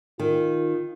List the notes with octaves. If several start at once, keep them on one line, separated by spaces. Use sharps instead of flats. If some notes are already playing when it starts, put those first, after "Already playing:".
D#3 F4